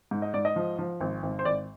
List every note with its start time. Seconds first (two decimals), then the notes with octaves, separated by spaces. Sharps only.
0.11 G#2
0.22 D#5
0.34 G#2 D5
0.45 D#5
0.56 F3
0.78 F3
1.00 G#1
1.23 G#1
1.39 C5
1.45 G#1 D5